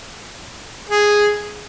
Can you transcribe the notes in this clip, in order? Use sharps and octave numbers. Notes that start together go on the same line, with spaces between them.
G#4